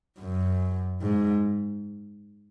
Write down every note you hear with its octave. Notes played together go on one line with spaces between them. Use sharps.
F#2
G#2